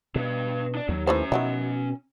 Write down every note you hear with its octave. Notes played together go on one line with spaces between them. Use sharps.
B2 D4 B4
D4 D5
D#2 F#3
E3 A3 C#4 C5 A#5
B2 D#3 F#3 E4